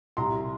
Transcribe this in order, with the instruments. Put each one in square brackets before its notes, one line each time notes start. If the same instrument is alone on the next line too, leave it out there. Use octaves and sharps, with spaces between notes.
[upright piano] C2 A#5 C6